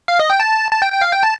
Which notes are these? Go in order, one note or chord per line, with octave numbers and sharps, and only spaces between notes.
F5
D#5
G5
A5
A5
G5
G5
F5
G5
A5